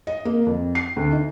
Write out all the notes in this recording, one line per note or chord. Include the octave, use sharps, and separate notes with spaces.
D#5
A#3
F2
C7
D2
D#4